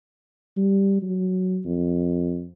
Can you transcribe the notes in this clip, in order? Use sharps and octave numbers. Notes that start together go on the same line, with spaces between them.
G3
F#3
F2